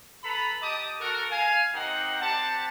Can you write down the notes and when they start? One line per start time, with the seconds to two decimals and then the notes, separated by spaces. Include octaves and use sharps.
0.24 A4 B4 A#5 B5
0.62 G4 D#5 A5 D6 D#6
1.00 F#4 A4 A#4
1.31 F5 G#5
1.74 C4 D#4 G4 A#4 D#5 F#5
2.21 C4 G4 D5 F#5 A5